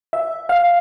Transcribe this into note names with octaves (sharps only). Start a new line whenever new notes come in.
E5
F5